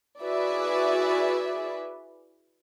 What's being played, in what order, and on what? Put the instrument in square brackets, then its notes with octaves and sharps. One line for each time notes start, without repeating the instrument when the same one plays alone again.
[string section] E4 F#4 G#4 B4 D5 E5